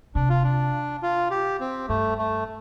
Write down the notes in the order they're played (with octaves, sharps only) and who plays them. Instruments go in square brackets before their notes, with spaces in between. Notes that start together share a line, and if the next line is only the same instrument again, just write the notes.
[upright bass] C3 [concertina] D4
[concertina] F4
D4
F4
G4
C4
[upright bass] G2 [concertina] A3
[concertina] A3